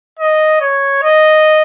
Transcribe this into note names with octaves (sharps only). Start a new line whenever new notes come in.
D#5
C#5
D#5